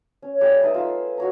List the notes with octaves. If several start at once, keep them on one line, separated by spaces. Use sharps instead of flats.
C#4
G3 A3 G#4 D6
D#4 B4 E5
F4 E6
F#4 C#5 A#5